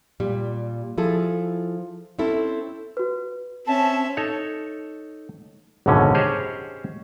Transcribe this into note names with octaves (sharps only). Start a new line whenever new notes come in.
A#2 G3
F3 E4 G#4 A4
C4 C#4 E4 A4
F#4 B4
C4 C#4 E5 A5
D#4 A4 C#5
G#1 C#2 F#2 B2 D3 C#4
C#4 G4 G#4 C5 C#5 D#5